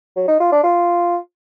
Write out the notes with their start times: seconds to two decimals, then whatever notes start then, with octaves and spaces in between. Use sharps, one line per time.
0.16 F#3
0.28 D#4
0.40 F4
0.52 D4
0.64 F4